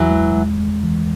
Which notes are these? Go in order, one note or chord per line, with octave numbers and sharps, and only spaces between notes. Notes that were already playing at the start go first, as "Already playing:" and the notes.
Already playing: E2 E3 F#3
G#3
G#3
G#3
E3